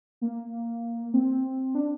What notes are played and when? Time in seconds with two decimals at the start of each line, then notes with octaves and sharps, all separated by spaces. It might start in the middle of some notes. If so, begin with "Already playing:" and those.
0.21 A#3
1.14 C4
1.75 D4